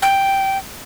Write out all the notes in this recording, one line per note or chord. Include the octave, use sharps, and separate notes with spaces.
G5